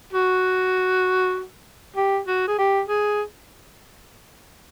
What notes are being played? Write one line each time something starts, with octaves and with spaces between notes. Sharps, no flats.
F#4
G4
F#4
G#4
G4
G#4